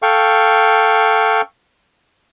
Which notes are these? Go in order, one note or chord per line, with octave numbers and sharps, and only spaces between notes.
A4 F5 G5 C#6